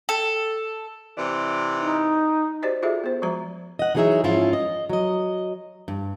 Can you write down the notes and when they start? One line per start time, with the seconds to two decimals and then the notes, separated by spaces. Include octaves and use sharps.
0.09 A4
1.15 C3 E3 D5
1.77 D#4
2.63 F#4 G4 C5 D5 D#5
2.82 F4 F#4 G#4 A4 D5 E5
3.04 B3 C5
3.22 F3 G#3 F#4 A#5
3.79 D#5 F#5
3.95 E3 F#3 D#4 G#4 C#5 E5
4.24 G#2 F3 C#4 E4 F4
4.53 D#5
4.90 F#3 D#5
5.88 G2